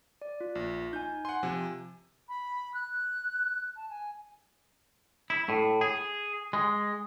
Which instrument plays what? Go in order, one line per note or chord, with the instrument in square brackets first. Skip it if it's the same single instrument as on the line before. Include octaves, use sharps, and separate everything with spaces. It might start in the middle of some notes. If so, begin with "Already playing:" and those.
[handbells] D5
F4
[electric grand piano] A#1 [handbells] F4
[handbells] D#4 G#5 [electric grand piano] G6
[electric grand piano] F#5 C6 [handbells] G#5
[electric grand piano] C3 F3
[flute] B5
F#6
A5
G#5
[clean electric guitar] E4
A2
G#4
G#3